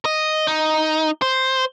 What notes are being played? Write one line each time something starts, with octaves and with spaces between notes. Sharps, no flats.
D#5
D#4
C5